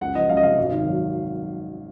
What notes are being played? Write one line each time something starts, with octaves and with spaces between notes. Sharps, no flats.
C#2 F#5
F3 D#5
C#2 F5
D#5
C3 F5
G#1
D#3
F#3